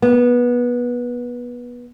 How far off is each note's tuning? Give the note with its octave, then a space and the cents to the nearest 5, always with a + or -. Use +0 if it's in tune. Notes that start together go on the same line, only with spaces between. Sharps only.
B3 -20